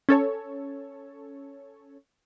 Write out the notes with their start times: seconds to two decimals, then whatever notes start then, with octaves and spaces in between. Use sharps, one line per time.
0.09 C#4 A4 C#5